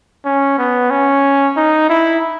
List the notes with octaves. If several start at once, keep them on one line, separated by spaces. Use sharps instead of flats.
C#4
B3
C#4
D#4
E4